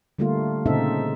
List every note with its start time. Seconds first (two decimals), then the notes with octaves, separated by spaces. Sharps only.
0.19 D3 G3 A3 A#3 F4
0.66 A#2 C#3 C4 D#4 A4 E5